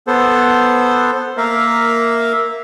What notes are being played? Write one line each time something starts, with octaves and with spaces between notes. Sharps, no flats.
B3 A4 C5
A#3 A#4 E5 F5